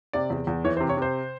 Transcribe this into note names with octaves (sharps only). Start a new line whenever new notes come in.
C3 D5
E2
E2
E3 C#5
C5
C3
C#5
C3 C5